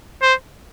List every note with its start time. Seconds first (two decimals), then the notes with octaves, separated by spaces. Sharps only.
0.22 C5